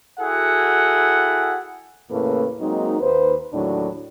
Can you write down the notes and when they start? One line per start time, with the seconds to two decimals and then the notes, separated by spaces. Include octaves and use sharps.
0.19 E4 F#4 G#4 A4 F#5 G5
2.10 E2 A2 C#3 A#3 A4 B4
2.60 F#3 G#3 A#3 C4 D#4
3.00 D#2 B4 C5
3.52 D#2 A2 D3 F#3 D4